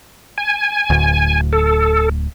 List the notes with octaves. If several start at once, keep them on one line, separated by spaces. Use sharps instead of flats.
G#5
D1 D2
A4